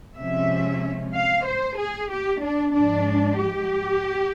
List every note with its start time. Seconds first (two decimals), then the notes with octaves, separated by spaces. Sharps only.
0.18 C3 F3 G#3 C#4 E5
1.14 F5
1.46 C5
1.79 G#4
2.11 G4
2.43 D4
2.74 G#2 F3 G#3 D4
3.39 G4